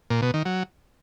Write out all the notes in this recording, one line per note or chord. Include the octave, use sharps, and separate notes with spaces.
A#2
B2
D#3
F#3